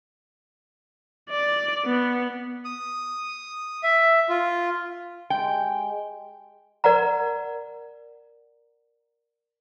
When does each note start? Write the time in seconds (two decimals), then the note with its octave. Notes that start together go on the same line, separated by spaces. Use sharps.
1.30 D5
1.85 B3
2.65 D#6
3.83 E5
4.29 F4
5.30 G#3 G4 G5
6.84 A#4 D5 F#5 A#5